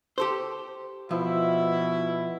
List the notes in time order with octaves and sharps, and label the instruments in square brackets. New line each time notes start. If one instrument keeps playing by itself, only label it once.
[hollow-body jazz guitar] G4 A4 C5
[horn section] B2 E4 [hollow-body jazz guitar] F3